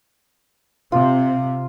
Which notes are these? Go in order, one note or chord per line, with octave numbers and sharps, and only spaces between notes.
C3 F4